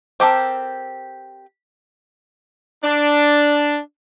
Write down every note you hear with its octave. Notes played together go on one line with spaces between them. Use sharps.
C4 G4 A4 A#4
D4